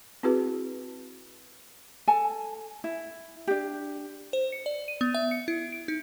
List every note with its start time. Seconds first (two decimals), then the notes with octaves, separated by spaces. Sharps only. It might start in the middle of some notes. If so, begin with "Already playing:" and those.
0.23 C4 E4 F#4 G#4 B4
2.07 A4 G#5 A5
2.84 E4
3.47 D4 G4
4.33 C5
4.52 C#7
4.66 D5
4.88 D#7
5.01 B3
5.14 E5
5.31 C#7
5.48 E4
5.72 D7
5.88 D#4